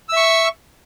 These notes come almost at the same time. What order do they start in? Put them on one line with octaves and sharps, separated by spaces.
E6 E5 C#6